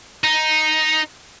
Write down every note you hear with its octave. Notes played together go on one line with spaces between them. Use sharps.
D#4